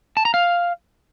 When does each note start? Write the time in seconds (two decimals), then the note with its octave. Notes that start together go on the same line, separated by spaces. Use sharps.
0.17 A5
0.25 A#5
0.34 F5